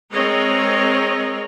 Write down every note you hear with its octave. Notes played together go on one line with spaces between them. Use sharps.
G#3 C4 A#4 C#5 D#5